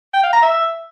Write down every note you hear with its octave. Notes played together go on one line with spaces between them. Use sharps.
G5
F5
A#5
E5